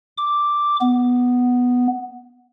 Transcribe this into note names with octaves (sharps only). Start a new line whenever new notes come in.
D6
B3